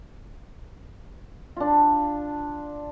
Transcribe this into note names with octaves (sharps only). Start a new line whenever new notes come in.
D4 F4